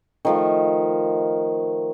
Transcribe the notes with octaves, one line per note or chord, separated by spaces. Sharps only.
D#3 F3 A3